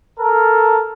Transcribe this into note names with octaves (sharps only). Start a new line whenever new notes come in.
A4 A#4